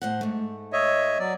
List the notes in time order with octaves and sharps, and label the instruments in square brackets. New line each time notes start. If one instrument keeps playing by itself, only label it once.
[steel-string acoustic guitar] A2 C5 F#5
G#2 A3
[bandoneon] C#5 D#5 E5
F#3 D5